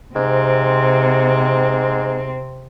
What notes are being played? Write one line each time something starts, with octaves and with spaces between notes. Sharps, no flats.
G#2 C3 C4